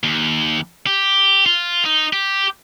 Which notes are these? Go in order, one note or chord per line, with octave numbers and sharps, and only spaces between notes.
D#2
G4
F4
D#4
G4